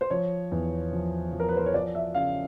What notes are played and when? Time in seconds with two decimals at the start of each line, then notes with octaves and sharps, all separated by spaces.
0.01 C5
0.10 F3 C#5
0.52 E2
0.93 F3
1.33 F3
1.40 A#4
1.49 B4
1.57 C5
1.66 C#5
1.74 F3 D5
1.95 E5
2.15 C#3 F5